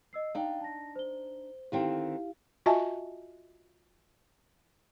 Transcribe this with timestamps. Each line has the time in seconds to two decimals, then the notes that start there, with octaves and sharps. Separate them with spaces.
0.13 D#5 E6 C7
0.35 D4 D#4 F5 G5
0.61 A5 A#6
0.96 C5 G7
1.72 D3 D#3 C4 E4 G4 F5
2.66 F4 F#4 D#5 E5 G#5 A5